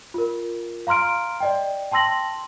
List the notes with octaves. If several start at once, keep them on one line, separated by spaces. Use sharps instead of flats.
F4 A#4
F5 A#5 C6 F6 D7
D5 D#5 G5
G5 A5 C6 E6 A#6 F#7